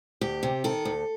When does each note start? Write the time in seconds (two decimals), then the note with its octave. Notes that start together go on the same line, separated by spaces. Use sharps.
0.21 D2 G4
0.43 C3
0.64 D#3 A4
0.85 D2